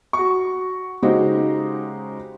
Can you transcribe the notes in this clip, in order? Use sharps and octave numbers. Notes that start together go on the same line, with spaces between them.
F#4 C#6
C#3 G#3 D#4 F#4 G4 C5